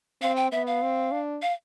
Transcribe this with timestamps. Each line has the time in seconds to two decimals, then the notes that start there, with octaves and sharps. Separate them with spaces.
0.22 C4 F5
0.36 G5
0.52 B3 E5
0.67 F5
0.82 C4
1.12 D4
1.42 F5